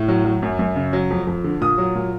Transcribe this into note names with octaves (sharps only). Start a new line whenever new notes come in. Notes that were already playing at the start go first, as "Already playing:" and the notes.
Already playing: A2
F#3
F#3
F#2
F#2
C#3
F#3
F2
F2
D3
A#2 D#6
F#3
A#2